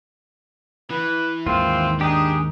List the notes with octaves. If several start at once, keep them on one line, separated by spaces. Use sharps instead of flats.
E3 B4
D#2 G#2 D#3 C4 F4
D4 D#4 G4 G#4